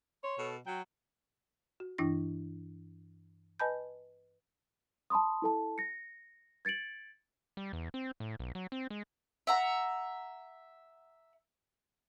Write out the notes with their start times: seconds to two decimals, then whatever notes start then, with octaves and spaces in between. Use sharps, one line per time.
0.23 C#5 C6
0.38 B2 A4
0.66 F#3 F#4 G5
1.80 F#4
1.98 G2 E3 D4 E4 A#6
3.60 B4 D#5 G#5 A5 B5 G6
5.10 A5 B5 C6 D#6
5.42 E4 A4 A5
5.78 A#6 C#7
6.65 G#6 A6 C#7 D7 F#7
7.57 G3
7.73 E2
7.94 C4
8.20 A2
8.39 B1
8.55 F#3
8.72 C4
8.90 G#3
9.47 E5 F#5 A#5